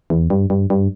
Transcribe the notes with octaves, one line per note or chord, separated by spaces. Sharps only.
E2
G2
G2
G2